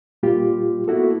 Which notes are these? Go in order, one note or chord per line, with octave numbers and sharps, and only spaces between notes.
A#2 G3 A#3 F4 G4
A#3 B3 E4 F#4 A4